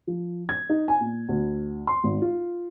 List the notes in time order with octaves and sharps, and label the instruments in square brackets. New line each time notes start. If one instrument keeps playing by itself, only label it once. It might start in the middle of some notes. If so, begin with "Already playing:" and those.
[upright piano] F3
G#6
D#4
G#5
A#2
D2
C6
G#1
F4